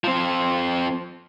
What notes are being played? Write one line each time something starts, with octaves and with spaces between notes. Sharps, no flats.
F3 C4